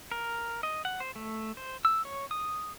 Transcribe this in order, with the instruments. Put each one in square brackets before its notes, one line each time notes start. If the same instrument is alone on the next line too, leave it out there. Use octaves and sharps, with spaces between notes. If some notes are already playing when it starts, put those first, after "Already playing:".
[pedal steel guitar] A#4
D#5
F#5
C5
A3
C5
E6
C#5
D#6